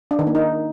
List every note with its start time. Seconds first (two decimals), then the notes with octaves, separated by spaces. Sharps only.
0.11 D4
0.19 D#3
0.27 A#3
0.35 D#4